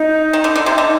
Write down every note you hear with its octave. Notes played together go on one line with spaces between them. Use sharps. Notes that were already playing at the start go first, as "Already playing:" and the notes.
Already playing: D#4
D#3
D3
D3
C3
D3 D#4